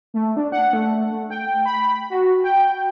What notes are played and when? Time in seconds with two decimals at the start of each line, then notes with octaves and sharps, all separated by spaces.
0.14 A3
0.37 D4
0.52 F#5
0.73 A3
1.11 A3
1.30 G5
1.66 B5
2.10 F#4
2.44 G5